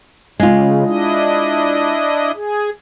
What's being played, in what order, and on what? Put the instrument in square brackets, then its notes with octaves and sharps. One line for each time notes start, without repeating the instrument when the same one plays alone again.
[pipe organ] C#3 [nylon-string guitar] G#3 F4
[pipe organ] D4 E4 D#5
G#4